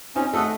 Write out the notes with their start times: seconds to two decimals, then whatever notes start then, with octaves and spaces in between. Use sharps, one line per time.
0.15 C4 C#4 D#4
0.33 A3 A4 D#5 F#5